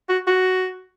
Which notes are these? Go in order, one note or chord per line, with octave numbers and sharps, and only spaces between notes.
F#4
F#4